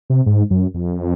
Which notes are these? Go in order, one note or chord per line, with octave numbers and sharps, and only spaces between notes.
C3
G#2
F#2
F2